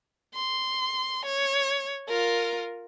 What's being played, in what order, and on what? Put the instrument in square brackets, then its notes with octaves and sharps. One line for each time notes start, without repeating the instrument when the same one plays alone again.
[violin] C6
C#5
F4 A#4